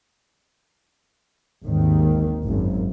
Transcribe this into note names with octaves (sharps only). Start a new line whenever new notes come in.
G#1 D#2 D#3
G#1 F#2